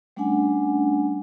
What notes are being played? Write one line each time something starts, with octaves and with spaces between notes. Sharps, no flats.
G3 A3 C#4 D4 F#5 G#5